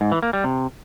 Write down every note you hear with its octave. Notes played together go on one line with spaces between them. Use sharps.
G#2
E3
A#3
G3
C3